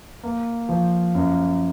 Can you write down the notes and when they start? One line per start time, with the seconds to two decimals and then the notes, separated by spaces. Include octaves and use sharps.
0.23 A#3
0.69 F3
1.15 F#2